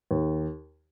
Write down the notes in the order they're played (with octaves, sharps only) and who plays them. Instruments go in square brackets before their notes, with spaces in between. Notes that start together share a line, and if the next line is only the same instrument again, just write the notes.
[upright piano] D#2